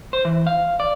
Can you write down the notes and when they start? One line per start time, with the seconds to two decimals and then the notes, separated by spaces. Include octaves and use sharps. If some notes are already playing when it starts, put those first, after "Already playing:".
0.13 C5
0.25 E3
0.47 F5
0.80 D5